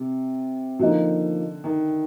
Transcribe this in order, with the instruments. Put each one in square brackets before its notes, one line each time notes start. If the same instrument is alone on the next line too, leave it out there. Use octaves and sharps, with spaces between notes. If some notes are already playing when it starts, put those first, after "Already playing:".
Already playing: [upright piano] C3
[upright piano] D3 [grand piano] F3 A#3 D#4
[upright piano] D#3